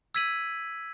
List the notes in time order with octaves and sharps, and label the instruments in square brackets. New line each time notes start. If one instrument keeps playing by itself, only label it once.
[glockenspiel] E6 G#6 B6 D#7 F#7